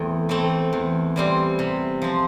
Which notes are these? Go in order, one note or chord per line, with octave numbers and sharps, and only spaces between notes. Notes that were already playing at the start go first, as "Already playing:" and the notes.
Already playing: E2 A3 C4
E3 A3 C4
E2
E3 G3 C4
C3
F3 C4